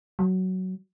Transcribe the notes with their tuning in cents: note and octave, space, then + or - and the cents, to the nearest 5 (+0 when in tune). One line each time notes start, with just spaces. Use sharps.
F#3 +10